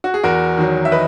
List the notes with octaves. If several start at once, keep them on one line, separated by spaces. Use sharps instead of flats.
F#4
G#4
E2 F#4 A#4
D#3 F#3
E5
B4 D#5